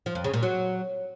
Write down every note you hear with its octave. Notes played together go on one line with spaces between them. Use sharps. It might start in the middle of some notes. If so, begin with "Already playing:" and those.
F3
F2
C#3
A#2
F#3